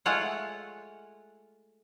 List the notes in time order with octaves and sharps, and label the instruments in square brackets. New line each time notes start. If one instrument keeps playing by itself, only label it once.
[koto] G#3 A3 F4 C#5 F#5